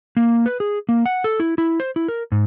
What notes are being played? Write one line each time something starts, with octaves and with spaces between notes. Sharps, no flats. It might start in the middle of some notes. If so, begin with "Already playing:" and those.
A#3
B4
G#4
A#3
F#5
A4
E4
E4
C5
E4
A#4
G#2